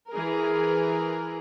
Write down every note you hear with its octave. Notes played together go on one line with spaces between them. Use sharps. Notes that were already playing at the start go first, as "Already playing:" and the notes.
E3 G#4 A#4